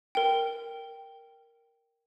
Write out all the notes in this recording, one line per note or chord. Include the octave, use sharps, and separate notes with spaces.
A#4 G5